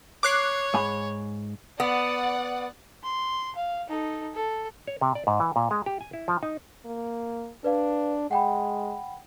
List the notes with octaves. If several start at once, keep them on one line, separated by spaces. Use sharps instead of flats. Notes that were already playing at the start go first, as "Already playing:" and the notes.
C#5 D6 F#6 C7
G#2 G#5 B5
B3 D5 F#5
C6
F5
D#4 A4
A4
C#5
C3
D5
G#2
E3
A#2
G#3
G4
G#5
E4
F3
D#4
A#3
D4 B4 D5 F5
G#3 F#5 G5 B5